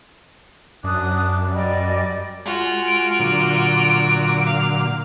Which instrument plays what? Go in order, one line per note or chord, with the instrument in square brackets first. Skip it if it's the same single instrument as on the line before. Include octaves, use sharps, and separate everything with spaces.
[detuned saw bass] F#2 [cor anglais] D4 [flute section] D#6 F#6
[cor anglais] G3 [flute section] D5 D#5
[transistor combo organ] G#3 [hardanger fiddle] F4 F#4
[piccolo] D7
[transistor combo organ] A#2 D3 F#3 [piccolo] D7
[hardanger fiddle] F5